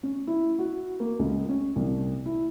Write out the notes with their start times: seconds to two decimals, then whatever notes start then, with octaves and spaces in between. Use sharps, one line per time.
0.03 C#4
0.27 E4
0.59 F#4
1.00 A#3
1.19 C#2
1.49 C#4
1.76 C2
2.26 E4